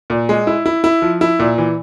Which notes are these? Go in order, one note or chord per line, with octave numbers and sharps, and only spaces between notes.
A#2
G#3
E4
E4
E4
F3
E4
A#2
E3